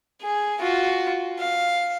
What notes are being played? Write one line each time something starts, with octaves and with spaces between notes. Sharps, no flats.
G#4
F4 F#4
F5